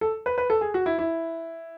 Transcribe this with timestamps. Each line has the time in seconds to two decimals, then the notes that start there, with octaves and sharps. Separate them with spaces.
0.01 A4
0.26 B4
0.38 B4
0.50 A4
0.61 G#4
0.74 F#4
0.86 E4
0.99 E4